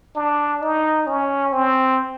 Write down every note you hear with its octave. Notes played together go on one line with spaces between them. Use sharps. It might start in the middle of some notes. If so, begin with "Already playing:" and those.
D4
D#4
C#4
C4